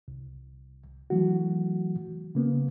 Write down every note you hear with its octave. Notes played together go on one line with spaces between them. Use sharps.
C2
E3 F#3 A3 F#4
C#3 A#3 B3